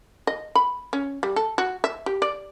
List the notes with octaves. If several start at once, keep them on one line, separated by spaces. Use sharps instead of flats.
D#5
B5
C#4
G3
A4
F#4
E5
G4
D5